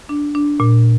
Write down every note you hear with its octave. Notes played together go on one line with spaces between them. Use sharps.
D4
D4
A#2